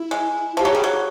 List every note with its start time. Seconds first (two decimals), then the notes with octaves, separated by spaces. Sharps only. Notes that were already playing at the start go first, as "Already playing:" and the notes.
Already playing: E4
0.11 G#3
0.57 F3 G4
0.65 F#3
0.72 G3 G#4
0.84 F#3